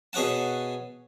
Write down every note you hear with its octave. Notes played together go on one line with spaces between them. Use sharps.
B2 G#4 C#5 F#5 A5